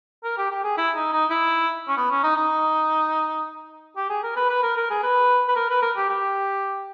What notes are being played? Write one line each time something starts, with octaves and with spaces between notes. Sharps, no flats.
A#4
G4
G4
G#4
E4
D#4
D#4
E4
C#4
B3
C#4
D#4
D#4
G4
G#4
A#4
B4
B4
A#4
A#4
G#4
B4
B4
A#4
B4
A#4
G4
G4